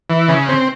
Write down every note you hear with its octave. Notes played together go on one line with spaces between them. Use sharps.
E3
C#3
C4